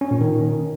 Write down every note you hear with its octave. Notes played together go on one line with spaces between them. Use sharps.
C#4
A#2
D#3